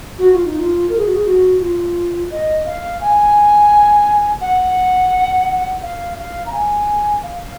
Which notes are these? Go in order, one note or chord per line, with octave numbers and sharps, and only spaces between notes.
F#4
F4
D#4
F4
A#4
G#4
F#4
G#4
F#4
F4
D#5
F5
G#5
F#5
F5
F5
A#5
G#5
F5